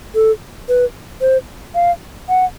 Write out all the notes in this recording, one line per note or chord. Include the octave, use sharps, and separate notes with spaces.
A4
B4
C5
F5
F#5